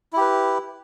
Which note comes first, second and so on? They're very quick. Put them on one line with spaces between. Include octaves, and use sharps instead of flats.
E4 G4 B4